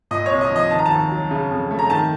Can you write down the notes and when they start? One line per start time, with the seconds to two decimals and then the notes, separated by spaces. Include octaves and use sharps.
0.11 A#2 D#5
0.26 C#5
0.31 C2
0.41 D#5
0.51 F3
0.56 D#5
0.71 D#3 A5
0.79 A#5
0.86 D#2 A5
1.11 F#3
1.31 C#3
1.51 F2
1.71 A3
1.79 A#5
1.90 D#3 A5